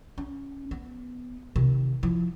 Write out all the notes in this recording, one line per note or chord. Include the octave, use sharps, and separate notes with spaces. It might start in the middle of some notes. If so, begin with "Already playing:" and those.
C#4
B3
C3 D#3
F3 E4